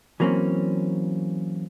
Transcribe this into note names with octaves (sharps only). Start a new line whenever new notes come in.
E3 F#3 A#3 C4 C#4